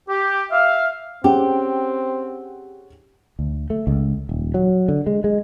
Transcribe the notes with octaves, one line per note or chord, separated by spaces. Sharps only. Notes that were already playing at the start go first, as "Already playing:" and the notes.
G4
E5 F5
C4 C#4 G4 G#4 F#5
D2
A3
C#2
D#1
F#3
D3
G#3
G#3